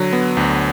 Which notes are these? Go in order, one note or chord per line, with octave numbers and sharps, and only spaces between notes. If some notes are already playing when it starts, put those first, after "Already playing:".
Already playing: D3 F#3
B3
D2